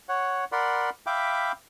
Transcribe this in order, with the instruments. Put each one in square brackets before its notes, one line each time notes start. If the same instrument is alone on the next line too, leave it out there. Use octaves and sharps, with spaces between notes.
[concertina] C#5 F#5
A#4 D5 F#5 B5 C6
E5 F5 G5 B5 D6